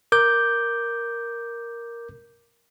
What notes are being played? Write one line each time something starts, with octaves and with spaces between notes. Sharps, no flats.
A#4 D6 G6